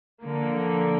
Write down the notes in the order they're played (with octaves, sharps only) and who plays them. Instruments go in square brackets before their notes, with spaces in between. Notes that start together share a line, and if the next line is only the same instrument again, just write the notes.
[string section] D3 F3 A#3